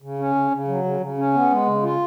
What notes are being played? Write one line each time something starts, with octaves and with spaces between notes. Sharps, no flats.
C#3
C#4
C#3
C#3
F#3
C#3
C#3
C#4
B3
G#3
C#3
F4